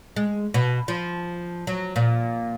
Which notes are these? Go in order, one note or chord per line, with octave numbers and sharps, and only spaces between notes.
G#3
B2
F3
F#3
A#2